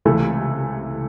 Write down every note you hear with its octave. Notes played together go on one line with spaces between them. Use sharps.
C#2 C3 E3 A3